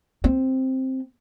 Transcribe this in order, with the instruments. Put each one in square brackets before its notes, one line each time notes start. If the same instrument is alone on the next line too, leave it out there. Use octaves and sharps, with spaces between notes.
[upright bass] C4